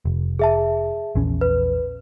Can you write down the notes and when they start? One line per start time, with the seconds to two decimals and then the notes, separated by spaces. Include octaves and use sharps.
0.05 F1
0.39 G#4 E5 A5
1.15 A#1 E2 C#4
1.41 B4